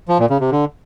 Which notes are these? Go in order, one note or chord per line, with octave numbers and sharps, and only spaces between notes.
F3
A#2
C#3
C3
D3